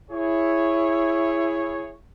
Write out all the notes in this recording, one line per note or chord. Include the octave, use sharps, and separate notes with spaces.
E4 G#4 C#5